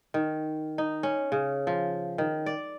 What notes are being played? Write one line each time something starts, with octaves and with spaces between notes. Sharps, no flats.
D#3
D#4
C#4
C#3
F3
D#3
D5